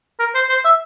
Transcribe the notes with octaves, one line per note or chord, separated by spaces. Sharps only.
A#4
C5
C5
E5